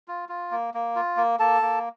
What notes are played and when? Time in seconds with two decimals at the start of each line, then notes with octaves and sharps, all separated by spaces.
0.08 F4
0.29 F4
0.51 A#3
0.74 A#3
0.96 F4
1.17 A#3
1.39 A#3 A4 A5
1.62 A#3